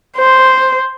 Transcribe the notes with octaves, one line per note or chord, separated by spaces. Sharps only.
C5